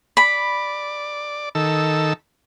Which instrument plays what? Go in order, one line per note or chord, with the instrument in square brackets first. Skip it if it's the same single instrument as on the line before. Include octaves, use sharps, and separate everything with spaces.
[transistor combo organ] D5 [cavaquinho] B5
[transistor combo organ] D#3 A4 E6